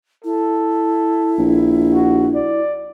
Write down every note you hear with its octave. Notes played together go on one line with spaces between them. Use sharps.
E4 A4
A#1
F#4
D5